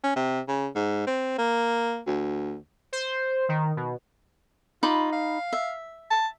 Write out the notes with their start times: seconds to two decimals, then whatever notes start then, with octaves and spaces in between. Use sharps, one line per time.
0.04 C#4
0.16 C3
0.48 C#3
0.75 G#2
1.07 C4
1.38 A#3
2.07 D2
2.93 C5
3.49 D#3
3.77 B2
4.83 D#4 F4 B5 D6
5.12 F5
5.53 E5
6.11 A5